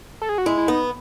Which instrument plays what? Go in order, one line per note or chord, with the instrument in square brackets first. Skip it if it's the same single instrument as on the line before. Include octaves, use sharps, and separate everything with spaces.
[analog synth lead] A4
G#4
F#4
[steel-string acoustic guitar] G#3 [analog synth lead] E4
[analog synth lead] E4
[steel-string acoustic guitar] B3 [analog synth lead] D#4